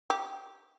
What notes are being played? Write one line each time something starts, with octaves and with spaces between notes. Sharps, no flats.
G4